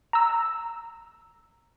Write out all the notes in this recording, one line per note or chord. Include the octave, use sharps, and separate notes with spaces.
A#5 E6